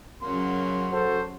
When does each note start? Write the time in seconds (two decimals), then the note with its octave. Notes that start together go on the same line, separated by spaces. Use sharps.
0.22 F#2 C#3 F#3 A#3 C6
0.92 F#4 A4 C5